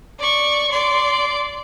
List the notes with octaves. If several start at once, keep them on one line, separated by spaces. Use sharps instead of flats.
D5 C#6
D5 C6